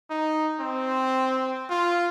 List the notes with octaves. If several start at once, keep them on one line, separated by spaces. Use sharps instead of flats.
D#4
C4
F4